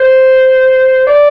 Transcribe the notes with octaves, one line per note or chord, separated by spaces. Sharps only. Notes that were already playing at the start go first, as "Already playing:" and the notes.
Already playing: C5
D5